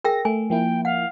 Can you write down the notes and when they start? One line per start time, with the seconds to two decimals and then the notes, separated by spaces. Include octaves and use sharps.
0.04 G#4 A#4 G5 A#6
0.25 A3 G#5
0.50 F3 A#3 E4 G5
0.85 F5 F#5